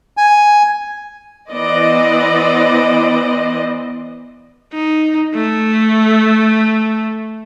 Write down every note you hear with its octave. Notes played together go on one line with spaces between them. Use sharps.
G#5
E3 B3 C5 D5 D#5
D#4
A3